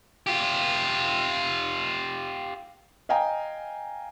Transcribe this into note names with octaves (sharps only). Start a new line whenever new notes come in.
F4 G4
D#5 F5 G5 G#5 A#5